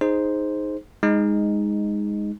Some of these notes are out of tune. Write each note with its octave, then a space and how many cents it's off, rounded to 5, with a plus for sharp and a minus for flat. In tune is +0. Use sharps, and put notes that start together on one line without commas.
D#4 +0 G#4 +10 C5 +0
G#3 -10 D#4 +0